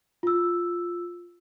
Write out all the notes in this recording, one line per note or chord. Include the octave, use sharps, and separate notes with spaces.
F4 E6